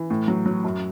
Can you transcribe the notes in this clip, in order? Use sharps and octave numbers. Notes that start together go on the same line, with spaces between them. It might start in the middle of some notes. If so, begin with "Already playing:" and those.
Already playing: E3
A2
F#3
F#3
F#2